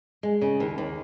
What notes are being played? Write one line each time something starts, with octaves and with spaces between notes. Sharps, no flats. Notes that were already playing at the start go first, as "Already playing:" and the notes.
G#3
C#3
D#2
D#2